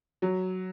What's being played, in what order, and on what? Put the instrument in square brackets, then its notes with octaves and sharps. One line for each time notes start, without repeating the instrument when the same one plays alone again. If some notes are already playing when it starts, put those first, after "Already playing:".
[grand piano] F#3